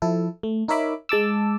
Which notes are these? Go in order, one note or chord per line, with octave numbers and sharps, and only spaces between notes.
F3 E4 A4
A3
D#4 A#4 C#5 E5 B5 D6
G#3 A5 D6 E6